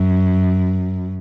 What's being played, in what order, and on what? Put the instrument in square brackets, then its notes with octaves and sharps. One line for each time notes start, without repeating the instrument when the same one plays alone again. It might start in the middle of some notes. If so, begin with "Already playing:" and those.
Already playing: [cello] F#2